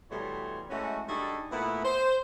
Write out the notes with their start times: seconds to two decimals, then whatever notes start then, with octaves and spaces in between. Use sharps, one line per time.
0.11 B2 E3 G3 A3 C#5 C6
0.70 E3 G#3 A3 C#4 F#4
1.08 G3 D4 D#4 F#4 G#4 A4
1.51 A#2 A3 B3 E4
1.84 C5